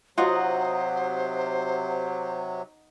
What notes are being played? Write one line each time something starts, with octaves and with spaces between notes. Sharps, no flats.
C3 F#3 D#4 F4 F#4 C5 D#5 F#5